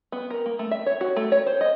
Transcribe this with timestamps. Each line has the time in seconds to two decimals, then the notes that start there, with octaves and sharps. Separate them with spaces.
0.12 B3
0.30 A#4
0.46 A#3
0.59 A3
0.71 E5
0.86 C#5
1.01 F#4
1.16 A3
1.32 C#5
1.47 C5
1.61 D#5